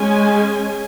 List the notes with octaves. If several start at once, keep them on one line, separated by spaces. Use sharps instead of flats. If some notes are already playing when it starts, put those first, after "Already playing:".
Already playing: G#3 C#4 G#5